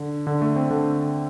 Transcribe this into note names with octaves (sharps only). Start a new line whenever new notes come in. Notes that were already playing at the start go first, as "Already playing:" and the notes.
Already playing: D3
D3
A3
C4
D3